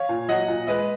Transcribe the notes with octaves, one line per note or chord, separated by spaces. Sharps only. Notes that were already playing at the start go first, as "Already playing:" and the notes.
Already playing: C#5 F5
A#2
F#3 D#5 F#5
A#2
G#3 B4 D#5